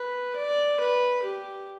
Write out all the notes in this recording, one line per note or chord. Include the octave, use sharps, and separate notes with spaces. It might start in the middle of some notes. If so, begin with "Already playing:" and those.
Already playing: B4
D5
B4
G4